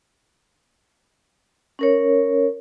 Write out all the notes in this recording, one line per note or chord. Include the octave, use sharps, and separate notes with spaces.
C#4 A#4 C#5